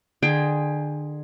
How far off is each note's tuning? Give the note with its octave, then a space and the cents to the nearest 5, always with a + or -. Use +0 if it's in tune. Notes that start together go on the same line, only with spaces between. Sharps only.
D3 +30 G#4 +0 G5 +20